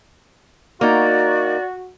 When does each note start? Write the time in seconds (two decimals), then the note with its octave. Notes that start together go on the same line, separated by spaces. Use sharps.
0.81 A#3 D#4 F#4 D5